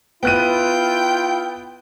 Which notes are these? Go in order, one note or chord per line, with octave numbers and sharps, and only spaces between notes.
B3 E4 F4 G5 F#6 D#7